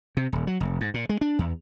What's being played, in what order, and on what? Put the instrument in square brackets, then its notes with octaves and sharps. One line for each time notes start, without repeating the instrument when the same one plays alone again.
[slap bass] C3
D#1
F#3
F1
G#2
A#2
G#3
D4
E2